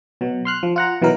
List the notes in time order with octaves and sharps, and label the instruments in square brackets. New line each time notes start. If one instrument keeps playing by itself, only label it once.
[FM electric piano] B2 F#3
C6 F6 F#6
F3
F4 F#5 A#5
B2 E3 F#3 D#4 A#4